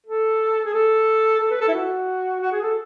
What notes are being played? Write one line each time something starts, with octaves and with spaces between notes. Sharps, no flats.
A4
G#4
A4
A4
B4
A4
E4
F#4
F#4
G#4
A4